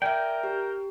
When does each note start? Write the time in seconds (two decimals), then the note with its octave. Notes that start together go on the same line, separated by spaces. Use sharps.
0.02 A#4 D5 E5 G5
0.43 G4